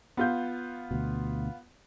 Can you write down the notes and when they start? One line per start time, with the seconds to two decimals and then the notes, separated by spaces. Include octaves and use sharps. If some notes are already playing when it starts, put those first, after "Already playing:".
0.17 B3 F4 G6
0.91 D2 B2